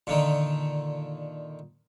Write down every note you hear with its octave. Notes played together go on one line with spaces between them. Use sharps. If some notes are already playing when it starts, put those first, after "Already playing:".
A#2 D3 D#3